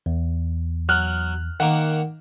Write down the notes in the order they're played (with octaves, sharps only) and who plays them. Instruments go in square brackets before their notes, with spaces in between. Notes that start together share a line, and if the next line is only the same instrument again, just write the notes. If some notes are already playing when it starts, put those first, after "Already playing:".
[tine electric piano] E2
[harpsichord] F#3 [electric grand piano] F6 F#6
[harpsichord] D#3 A#3 D6 [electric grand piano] F#5